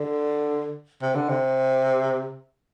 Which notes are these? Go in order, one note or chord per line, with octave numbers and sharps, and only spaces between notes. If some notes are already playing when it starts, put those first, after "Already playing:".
Already playing: D3
C3
D3
C3